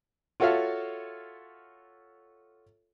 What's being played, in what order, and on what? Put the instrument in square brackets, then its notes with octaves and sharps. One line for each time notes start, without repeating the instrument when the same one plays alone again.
[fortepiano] F4 F#4 A4 C#5 E5 F5